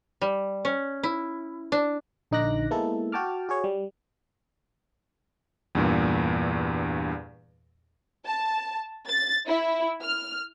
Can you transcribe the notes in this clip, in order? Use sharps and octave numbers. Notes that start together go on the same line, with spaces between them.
G3
C#4
E4
D4
A#1 D3 D#4 D6 F#6 A#6
G#3 A#3 B3 E4 A4
F#4 G5 A5 D6 F6
F#4 G#4 C#5
G3
E2 G2 A#2
A5
A6
E4
F6